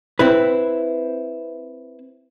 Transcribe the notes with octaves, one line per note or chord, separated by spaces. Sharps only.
C4 E4 B4